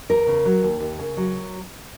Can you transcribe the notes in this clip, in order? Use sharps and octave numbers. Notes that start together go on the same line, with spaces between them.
E2 A#4
C#3
F#3
D#2
D#2
C#3
F#3